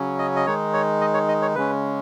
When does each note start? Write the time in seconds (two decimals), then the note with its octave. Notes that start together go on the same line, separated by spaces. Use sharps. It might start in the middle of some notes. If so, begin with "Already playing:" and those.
Already playing: C#3 F#3 C#4
0.19 D#5
0.36 D#5
0.46 D#3 G#3 D#4 C#5
0.74 C#5
1.01 D#5
1.14 C#5
1.28 D#5
1.42 C#5
1.55 C#3 G#3 C#4 B4